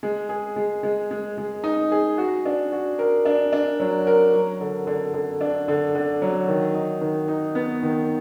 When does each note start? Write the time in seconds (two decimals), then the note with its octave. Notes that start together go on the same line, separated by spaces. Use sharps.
0.03 G#3
0.29 G#4
0.56 G#3
0.83 G#3
1.11 G#3
1.38 G#3
1.64 D#4
1.92 G#4
2.18 F#4
2.45 D4
2.72 F#4
2.99 A#4
3.25 D4
3.53 D4
3.80 F#3
4.07 A#4
4.33 F#3
4.60 D3
4.87 D3
5.14 D3
5.41 D4
5.68 D3
5.95 D3
6.22 F#3
6.48 D#3
6.74 D#4
7.01 D#3
7.28 D#4
7.55 B3
7.82 D#3